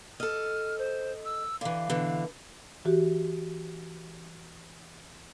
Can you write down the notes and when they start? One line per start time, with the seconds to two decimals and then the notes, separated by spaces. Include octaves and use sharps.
0.20 A4 D#5 F6
0.79 C5
1.25 E6
1.61 D3 E3 F5
1.90 B2 D3 E3
2.85 E3 F#4 G4